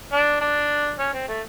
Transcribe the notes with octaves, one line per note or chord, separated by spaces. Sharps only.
D4
D4
C#4
C4
A3